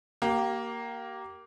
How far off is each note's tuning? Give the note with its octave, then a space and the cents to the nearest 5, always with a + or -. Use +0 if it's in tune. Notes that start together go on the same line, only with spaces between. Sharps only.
A#3 +0 G4 -30